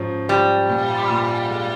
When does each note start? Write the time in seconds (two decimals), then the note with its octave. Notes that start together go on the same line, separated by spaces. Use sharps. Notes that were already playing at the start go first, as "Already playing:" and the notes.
Already playing: G#2 F3 C#4
0.29 F3 G3
0.69 A#2
1.10 A#2
1.50 G#3